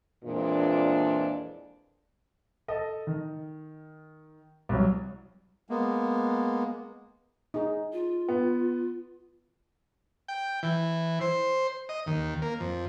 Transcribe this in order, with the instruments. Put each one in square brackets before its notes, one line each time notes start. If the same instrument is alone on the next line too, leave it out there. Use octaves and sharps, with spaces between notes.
[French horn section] F2 A#2 E3 G#3 D4
[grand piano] A4 D#5
D#3
C2 F#3
[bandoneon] G#3 A#3 B3
[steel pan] D#4 G#4
[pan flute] F4
[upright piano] B3
[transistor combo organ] G5
E3
C5
D#5
D#2
A#3
F2